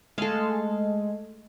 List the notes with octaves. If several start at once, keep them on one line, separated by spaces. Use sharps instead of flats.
G#3 A3 A4 F5